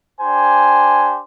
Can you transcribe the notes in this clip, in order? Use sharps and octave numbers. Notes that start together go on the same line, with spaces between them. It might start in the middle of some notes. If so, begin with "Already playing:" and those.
D4 G4 C5 G#5